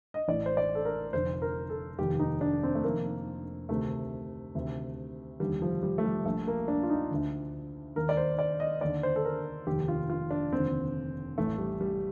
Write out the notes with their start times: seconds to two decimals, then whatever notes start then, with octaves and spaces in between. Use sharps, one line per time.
0.14 D#5
0.28 A1 A2 D5
0.46 C5
0.57 D5
0.75 A4
0.85 A#4
1.13 F1 F2 D3 C5
1.42 A#4
1.70 A4
1.98 F1 D#2 D#3 G4
2.19 D#4
2.41 D4
2.63 C4
2.75 A3
2.83 F1 F2 D#3 A#3
3.69 D2 C3 D#3 A3
4.55 D2 C3 D#3
5.40 F1 D#2 D3 G3
5.62 F3
5.83 G3
5.98 A3
6.04 G3
6.25 A#1 A#2 A3
6.47 A#3
6.68 D4
6.83 F4
6.90 D#4
7.11 D2 D3
7.96 D#2 D#3 A#4
8.09 D5
8.17 C5
8.39 D5
8.60 D#5
8.81 D#2 D3 D5
9.03 C5
9.16 A4
9.25 A#4
9.67 F1 D#2 D#3 G4
9.88 F4
10.10 F4
10.30 D4
10.53 F1 D#2 D3 C4
11.38 A1 A2 A3
11.58 G3
11.81 G3